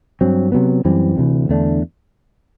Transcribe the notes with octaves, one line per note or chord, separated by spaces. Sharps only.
G2 F#3 C4
C3 F#3 B3
F#2 E3 G3 C4
D2 C3 E3
E2 D3 A3 D4